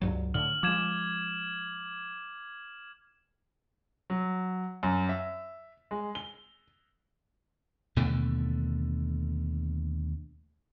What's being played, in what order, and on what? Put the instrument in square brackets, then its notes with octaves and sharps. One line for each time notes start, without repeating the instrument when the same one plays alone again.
[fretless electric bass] C#2 G2 F#3
[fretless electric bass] A2 D3 [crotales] F6 F#7
[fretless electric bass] F3 G#3 [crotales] D6 G#6 E7
[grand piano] F#3
F#2
E5
G#3
G7
[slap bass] D#2 B2 D3 A3